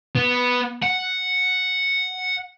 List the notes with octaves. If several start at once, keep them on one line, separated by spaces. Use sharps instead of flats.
B3
F#5